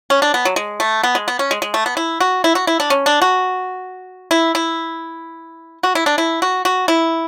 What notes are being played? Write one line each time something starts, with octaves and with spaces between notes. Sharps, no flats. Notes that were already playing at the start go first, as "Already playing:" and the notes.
C#4
D4
B3
F#3
G#3
A3
B3
G#3
B3
C#4
G#3
G#3
A3
B3
E4
F#4
E4
F#4
E4
D4
C#4
D4
F#4
E4
E4
F#4
E4
D4
E4
F#4
F#4
E4